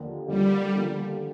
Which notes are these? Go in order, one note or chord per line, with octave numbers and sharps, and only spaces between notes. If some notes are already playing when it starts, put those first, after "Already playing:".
Already playing: D#2 D3 F3 A#3
D#2 D3 F3 G3 A#3
D3 F3 A#3